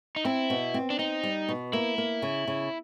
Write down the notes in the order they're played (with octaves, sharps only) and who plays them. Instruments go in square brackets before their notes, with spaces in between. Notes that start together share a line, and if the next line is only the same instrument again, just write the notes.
[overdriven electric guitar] D#4
[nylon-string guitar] C4 [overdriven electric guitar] E4
[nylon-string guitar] B2
C4
[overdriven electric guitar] D4
[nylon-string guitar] C4 [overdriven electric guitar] D#4
[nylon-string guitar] G3
B2
[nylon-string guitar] A#3 [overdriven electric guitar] E4
[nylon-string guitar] A#3
C#3
C#3